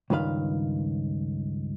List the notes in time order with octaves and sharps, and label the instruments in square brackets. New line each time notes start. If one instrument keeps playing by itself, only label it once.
[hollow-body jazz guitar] C#2 G2 D#3 B4 F5